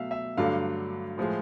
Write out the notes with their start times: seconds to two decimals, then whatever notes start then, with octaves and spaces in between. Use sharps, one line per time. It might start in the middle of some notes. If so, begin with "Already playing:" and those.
Already playing: B2 F#3 A3 E5 F5
0.11 E5
0.37 G2 D3 F#3 A3 F5
1.18 A2 F3 G#3